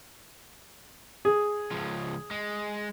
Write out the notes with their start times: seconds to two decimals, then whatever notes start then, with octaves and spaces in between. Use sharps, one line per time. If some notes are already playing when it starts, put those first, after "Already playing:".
1.25 G#4
1.72 C#2 F3
2.31 G#3